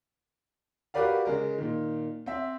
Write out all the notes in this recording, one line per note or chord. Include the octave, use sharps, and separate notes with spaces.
F#4 G4 A#4 B4 D5 F5
C#3 G#3 A#4
A#2 D#3
C4 E5